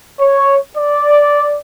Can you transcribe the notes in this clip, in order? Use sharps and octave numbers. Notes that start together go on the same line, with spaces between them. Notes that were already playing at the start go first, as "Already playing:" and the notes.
C#5
D5